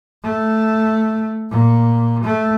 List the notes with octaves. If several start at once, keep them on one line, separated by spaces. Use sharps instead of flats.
A3
A#2
A3